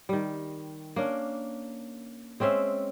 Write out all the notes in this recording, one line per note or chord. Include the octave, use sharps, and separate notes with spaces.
D#3 G3
A#3 C#4 D4
G#3 C4 C#4 E5